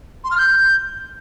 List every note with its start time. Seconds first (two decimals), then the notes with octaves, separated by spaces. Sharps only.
0.24 C6
0.31 F6
0.38 G6